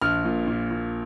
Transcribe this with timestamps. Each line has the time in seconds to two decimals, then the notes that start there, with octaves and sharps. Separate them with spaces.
0.02 A#1 F6
0.25 A#2
0.47 A#2
0.71 A#2